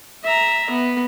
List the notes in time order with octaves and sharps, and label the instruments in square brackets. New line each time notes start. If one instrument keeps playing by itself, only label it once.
[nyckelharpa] E5 A#5
B3